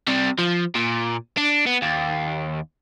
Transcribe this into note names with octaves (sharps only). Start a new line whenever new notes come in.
C3 G3
F3
A#2
D4
B3
D#2